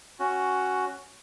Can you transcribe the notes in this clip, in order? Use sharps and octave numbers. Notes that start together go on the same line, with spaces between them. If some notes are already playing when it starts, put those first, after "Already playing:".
C#4 F#4